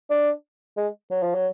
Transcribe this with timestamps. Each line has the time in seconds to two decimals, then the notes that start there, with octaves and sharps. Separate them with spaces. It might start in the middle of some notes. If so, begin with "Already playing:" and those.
0.10 D4
0.77 G#3
1.11 F#3
1.23 F3
1.35 F#3